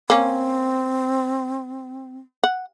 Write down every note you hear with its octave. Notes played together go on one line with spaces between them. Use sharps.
A#3 C4 C#4
F#5